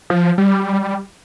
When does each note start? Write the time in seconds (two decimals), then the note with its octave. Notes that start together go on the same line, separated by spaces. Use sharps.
0.10 F3
0.38 G3